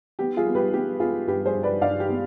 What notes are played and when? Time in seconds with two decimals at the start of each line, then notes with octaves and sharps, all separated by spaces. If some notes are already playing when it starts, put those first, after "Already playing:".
0.19 B3 G4
0.37 F4 G#4
0.46 B3
0.55 G4 B4
0.73 B3 G4
1.00 B3 F4 G#4
1.27 G2 G4 B4
1.45 G#4 C5
1.54 G2
1.63 B4 D5
1.81 G2 D5 F5
2.00 G4
2.09 B3